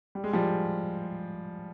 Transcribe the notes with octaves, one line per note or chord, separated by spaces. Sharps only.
G3
G#3
F3 G3